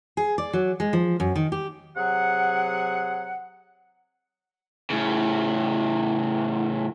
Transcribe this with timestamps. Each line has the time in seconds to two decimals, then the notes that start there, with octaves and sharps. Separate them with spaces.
0.17 G#4
0.38 D5
0.53 F#3
0.80 G#3
0.93 F3
1.20 F#2
1.36 D#3
1.52 G4
1.97 C3 F#3 G#4 F#5
4.90 A2 C#3